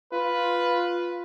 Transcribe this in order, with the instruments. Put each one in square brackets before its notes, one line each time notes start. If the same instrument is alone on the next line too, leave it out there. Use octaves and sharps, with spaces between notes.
[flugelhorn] F4 [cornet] B4